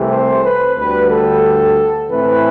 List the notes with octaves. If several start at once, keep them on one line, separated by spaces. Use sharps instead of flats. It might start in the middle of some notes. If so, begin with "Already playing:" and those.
Already playing: C2 C3 E3 A3
C5
B4
D2 D3 G3 B4
A4
A2 E3 A3 C4 B4